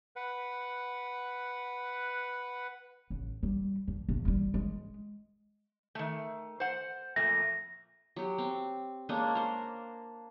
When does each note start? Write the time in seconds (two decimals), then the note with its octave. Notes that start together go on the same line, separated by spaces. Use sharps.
0.16 B4 F#5
3.10 A1
3.43 G3
3.88 G2
4.09 A#1 E2
4.25 G3 E4
4.54 G#3
5.95 D#3 A3
6.60 C5 F#5
7.16 F2 A#2 A3 A#6
8.16 F#3 G4
8.38 C4
9.09 G#3 A#3 C#4 D4
9.35 A#4 C5